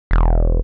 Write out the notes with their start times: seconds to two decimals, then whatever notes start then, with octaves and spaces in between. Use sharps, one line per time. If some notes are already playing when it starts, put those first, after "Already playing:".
0.11 E1